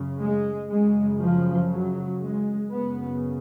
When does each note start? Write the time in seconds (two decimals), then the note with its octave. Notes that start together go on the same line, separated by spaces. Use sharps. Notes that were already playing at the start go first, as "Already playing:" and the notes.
Already playing: F#2 C#3
0.19 G#3
0.69 F#2 C#3 G#3
1.20 F3
1.70 F#3
2.21 G#3
2.72 F#2 C#3 B3